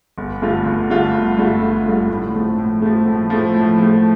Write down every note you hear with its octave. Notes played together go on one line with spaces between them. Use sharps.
G1
G2 D3 A3 F4
G1
G2 D3 A3 F4
G1
G2 D3 A3 F4
G1
G2 D3 A3 F4
A2
F3 A3
A2
F3 A3
A2
F3 A3
A2
F3 A3